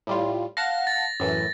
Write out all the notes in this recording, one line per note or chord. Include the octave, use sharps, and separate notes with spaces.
A2 G3 F4
F5 F#5 A5 A#6
A6
F#2 A2 E3